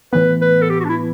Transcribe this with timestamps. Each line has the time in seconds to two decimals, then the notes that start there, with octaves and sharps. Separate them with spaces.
0.13 A2 E3 B3 B4
0.42 B4
0.62 A4
0.70 G4
0.80 F#4
0.85 D4
0.89 E4